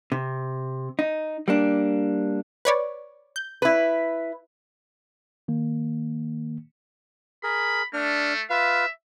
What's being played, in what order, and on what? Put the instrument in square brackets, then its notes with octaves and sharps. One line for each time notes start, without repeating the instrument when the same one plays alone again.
[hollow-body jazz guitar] C3
D#4
G3 A#3 D4
[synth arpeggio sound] B4 C#5 D5
G6
[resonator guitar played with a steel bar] E4 B4
[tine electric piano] D#3 A#3
[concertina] G#4 A#4 [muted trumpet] B5
[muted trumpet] A3 [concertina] D4 F6
[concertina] F4 B4 F5 [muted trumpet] E5